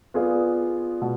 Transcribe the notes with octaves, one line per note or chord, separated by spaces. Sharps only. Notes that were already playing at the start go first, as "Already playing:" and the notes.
B3 F4 G#4 D5
B2